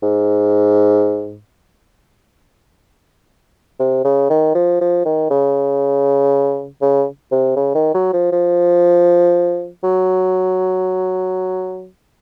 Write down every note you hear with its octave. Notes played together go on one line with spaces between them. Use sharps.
G#2
C3
C#3
D#3
F3
F3
D#3
C#3
C#3
C3
C#3
D#3
F#3
F3
F3
F#3